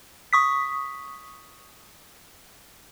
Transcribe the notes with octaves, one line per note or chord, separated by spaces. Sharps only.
C#6 D#6 B6